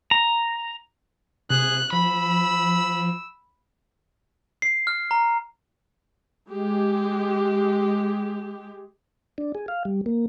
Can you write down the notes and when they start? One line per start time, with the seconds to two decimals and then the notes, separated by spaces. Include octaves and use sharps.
0.11 A#5
1.50 C3 G#4 F#6
1.92 F3 B5 E6
4.62 C7
4.87 F6
5.11 A#5
6.49 G#3 G4
9.38 D4
9.55 G#4
9.68 F5
9.85 G3
10.06 A#3